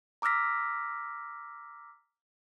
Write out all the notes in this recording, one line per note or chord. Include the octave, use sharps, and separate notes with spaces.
A#5 D6 E6 F6 A#6 B6